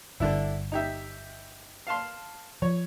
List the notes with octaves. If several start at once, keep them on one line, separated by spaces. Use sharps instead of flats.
G1 G2 D3 D4 E4
D#4 G4 E5
F5 A5 C6
F3 C#5